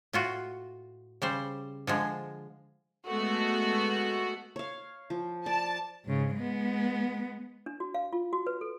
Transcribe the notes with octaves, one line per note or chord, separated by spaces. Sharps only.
A2 F4 F#4
C#3 G3 C5
D3 F3 G#3
G#3 A3 B3 F#4
C#5 F5
F3
D5 A5
G#2 C#3
G#3 B3
D4
F#4
F5
F4
F#4
B4
A4